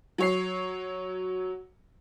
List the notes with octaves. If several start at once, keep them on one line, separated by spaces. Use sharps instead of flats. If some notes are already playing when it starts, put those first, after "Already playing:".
F#3 C#5 C7